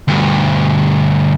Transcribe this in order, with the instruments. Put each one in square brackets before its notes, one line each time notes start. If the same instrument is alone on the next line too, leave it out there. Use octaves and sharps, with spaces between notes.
[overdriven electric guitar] D2 G2